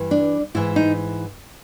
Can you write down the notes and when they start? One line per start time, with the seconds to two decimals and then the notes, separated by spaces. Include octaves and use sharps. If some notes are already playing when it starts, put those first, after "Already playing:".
Already playing: G2 E3
0.11 D4
0.54 G#2 E3 E4
0.76 D#4